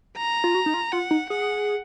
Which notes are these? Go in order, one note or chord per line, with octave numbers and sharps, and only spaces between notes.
A#5
F4
F#4
D#4
F4
F4 F#5
D#4
G#4 F#5